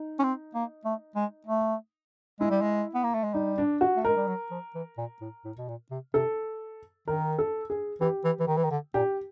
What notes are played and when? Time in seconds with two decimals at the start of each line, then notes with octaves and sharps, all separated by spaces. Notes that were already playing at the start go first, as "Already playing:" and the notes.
Already playing: D#4
0.19 C#4
0.23 C4
0.54 A#3
0.85 A3
1.16 G#3
1.47 A3
2.40 G#3 E4
2.50 G3
2.61 G#3
2.95 B3
3.04 A#3
3.14 A3
3.23 G#3
3.34 G3 D#4
3.58 D4
3.81 F#4
3.97 A3
4.05 G#3 A#4
4.17 G3
4.27 F#3
4.51 F3
4.75 E3
4.98 A#2
5.21 A2
5.45 A2
5.57 B2
5.68 A#2
5.91 C3
6.14 C3 A4
7.08 D#3 A#4
7.38 A4
7.70 G#4
8.01 E3 G4
8.24 E3
8.40 E3
8.47 D#3
8.57 E3
8.64 D#3
8.71 D3
8.94 A#2 G4